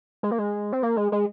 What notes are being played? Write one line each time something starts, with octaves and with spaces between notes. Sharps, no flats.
G#3
A#3
G#3
C4
A#3
G#3
G#3